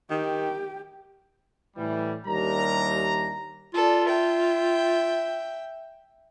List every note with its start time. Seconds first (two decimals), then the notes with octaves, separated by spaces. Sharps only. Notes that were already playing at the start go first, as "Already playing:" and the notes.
0.11 D#3 G4
1.77 A2 E3 G3
2.26 D#2 G3 D4 E4 A#4 A#5
3.74 F4 A4 D5
4.05 E5 G5